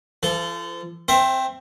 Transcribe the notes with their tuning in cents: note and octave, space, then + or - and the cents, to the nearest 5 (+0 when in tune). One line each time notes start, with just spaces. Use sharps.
F3 -40 A4 -5
C4 +0 C5 +20 E5 +20